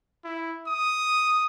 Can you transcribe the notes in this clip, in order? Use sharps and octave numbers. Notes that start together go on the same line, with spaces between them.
E4
D#6